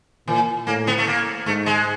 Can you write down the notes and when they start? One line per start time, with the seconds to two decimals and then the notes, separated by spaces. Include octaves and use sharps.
0.28 A#2 E3
0.67 A2 A#3
0.87 B3
0.98 A3
1.07 A#3
1.46 G#2 A3
1.66 G#3